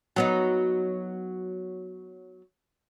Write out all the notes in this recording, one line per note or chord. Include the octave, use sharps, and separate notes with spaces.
F#3 B3 D#4